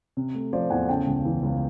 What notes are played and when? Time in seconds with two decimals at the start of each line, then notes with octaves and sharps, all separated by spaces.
0.17 C3
0.35 A3
0.53 F3 C5 D5
0.70 E2 F#5 G#5
0.88 C#3 G5 A5
1.07 C#2
1.25 E3
1.43 C#2